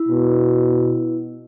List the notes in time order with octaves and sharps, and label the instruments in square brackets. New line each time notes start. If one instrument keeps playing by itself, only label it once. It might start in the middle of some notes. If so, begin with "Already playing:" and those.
Already playing: [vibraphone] E4
[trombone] B2